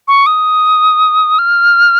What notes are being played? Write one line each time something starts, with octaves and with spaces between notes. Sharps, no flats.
C#6
D#6
F6